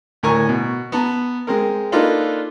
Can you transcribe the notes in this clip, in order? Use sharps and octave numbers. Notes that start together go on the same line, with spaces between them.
D2 A2 A#4 G#5 A#5 C#6
B2
B3 A5 A#5
G#3 C4 A#4
A#3 D4 D#4 F4 A4 B4